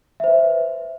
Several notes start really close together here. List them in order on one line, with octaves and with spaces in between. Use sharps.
E5 C5 B4